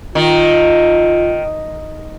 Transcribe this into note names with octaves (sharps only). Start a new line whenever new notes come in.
D#3 F4